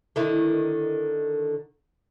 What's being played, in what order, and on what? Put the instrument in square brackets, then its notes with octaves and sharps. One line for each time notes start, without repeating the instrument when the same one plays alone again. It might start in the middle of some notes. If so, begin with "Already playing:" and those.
[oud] D3 D#3 E4